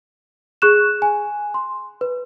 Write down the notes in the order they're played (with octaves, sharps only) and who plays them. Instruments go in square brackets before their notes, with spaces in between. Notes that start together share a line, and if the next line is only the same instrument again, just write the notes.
[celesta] G#4 C#6 F#6 E7
G#5
C6
B4